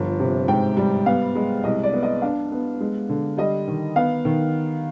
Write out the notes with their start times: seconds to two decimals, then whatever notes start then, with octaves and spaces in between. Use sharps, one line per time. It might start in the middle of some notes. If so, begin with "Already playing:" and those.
Already playing: G1 F3
0.20 C3
0.48 G#2 G5
0.77 G3
1.06 B3 F5
1.35 G#3
1.64 C2 D#5
1.83 D5
1.93 B3
2.03 D#5
2.22 D4 F5
2.52 B3
2.81 G#3
3.09 D3
3.38 G3 D#5
3.68 D#3
3.96 B3 F5
4.25 D#3